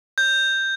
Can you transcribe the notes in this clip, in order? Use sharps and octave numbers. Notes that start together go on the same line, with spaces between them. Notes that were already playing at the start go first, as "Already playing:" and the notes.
G6